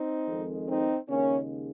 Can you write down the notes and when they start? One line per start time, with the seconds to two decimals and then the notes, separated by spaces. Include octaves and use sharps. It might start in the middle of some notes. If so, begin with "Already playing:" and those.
Already playing: C4 D#4
0.27 F2 D#3 G#3
0.68 C4 D#4
1.09 D#2 C#3 G#3 A#3 C#4